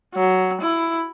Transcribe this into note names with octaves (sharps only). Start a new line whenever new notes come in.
F#3
E4